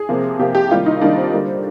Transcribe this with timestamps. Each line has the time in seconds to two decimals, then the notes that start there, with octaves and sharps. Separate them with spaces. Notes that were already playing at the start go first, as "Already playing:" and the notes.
Already playing: G#4
0.09 C3 F3 A#3
0.39 C3 F3 A#3 G4
0.55 G4
0.71 D#3 G3 A#3 F4
0.86 D#4
1.02 D#3 G3 A#3 D4
1.17 C4
1.33 D3 G3 A#3